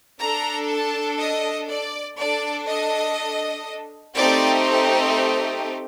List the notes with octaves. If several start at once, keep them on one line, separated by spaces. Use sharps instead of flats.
D4 A4 A#5
A5
D#5
D5
D4 A4 D5
D#5
A3 C4 D#4 G4 D5